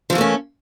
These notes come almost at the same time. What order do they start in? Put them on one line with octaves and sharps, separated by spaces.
F3 E3 A#3 A3 C#4